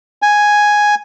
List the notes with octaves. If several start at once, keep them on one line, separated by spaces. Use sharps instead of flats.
G#5